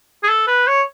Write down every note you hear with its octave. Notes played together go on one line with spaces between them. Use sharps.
G#4
A4
B4
C#5